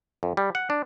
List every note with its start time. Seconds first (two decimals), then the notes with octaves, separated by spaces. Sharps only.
0.23 F2
0.37 G3
0.55 F#5
0.70 D4